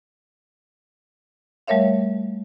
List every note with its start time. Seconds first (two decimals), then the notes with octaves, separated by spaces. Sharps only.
1.67 G3 A3 A#4 C#5 E5 F5